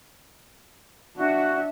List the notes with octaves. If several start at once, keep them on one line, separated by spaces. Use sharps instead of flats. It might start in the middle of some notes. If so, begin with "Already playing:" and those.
D4 F#4 E5